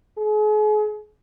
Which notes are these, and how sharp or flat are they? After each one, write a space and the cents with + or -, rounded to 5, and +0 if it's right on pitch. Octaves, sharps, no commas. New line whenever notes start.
G#4 +40